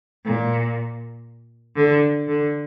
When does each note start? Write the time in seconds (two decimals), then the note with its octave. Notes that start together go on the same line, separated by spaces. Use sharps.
0.25 A#2
1.76 D3
2.27 D3